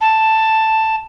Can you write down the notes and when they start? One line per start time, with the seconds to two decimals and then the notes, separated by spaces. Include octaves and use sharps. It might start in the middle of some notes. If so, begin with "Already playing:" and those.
0.01 A5